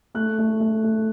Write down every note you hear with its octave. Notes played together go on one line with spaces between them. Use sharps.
A3 F#6
A3
A3
A3